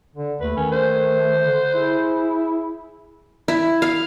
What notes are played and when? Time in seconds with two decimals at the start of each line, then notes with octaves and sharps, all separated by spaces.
0.15 D3
0.41 D#2 A3 B4
0.57 D#3 C#4
0.72 C5
1.43 D3
1.74 E4 G#4
3.48 E4
3.82 F5